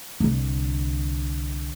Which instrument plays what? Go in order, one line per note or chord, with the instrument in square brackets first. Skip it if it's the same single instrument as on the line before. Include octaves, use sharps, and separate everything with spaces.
[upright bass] C2 D3